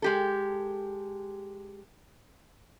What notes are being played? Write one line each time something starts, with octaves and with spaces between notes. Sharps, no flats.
G#3 G4 A4